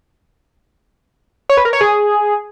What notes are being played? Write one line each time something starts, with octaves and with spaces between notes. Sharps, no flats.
C#5
B4
A#4
C#5
G#4